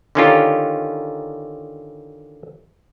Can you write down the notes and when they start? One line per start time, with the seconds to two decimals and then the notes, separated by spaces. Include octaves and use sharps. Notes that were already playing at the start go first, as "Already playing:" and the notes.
0.15 D3 D#3 C#4 D#4 F4 G4